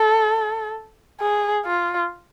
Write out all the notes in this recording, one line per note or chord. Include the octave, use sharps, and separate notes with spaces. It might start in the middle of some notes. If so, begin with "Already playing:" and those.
Already playing: A4
G#4
F4